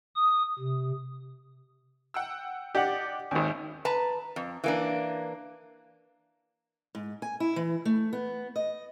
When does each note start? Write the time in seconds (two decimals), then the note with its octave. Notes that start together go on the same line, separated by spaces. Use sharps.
0.16 D#6
0.59 C3
2.14 F#5 G5 E6
2.75 D4 G4 D5 D#5 F#5
3.31 G#1 D#2 C#4
3.85 B4 A5 A#5
4.36 F2
4.64 E3 A#3 D4
6.95 G#2
7.22 G#5
7.40 E4
7.56 E3
7.85 A3
8.13 B3
8.56 D#5